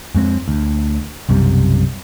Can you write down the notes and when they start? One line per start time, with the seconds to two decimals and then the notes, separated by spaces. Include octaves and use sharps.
0.15 F2 G#3 C4
0.48 D2
1.29 B1 F#2 C3 G3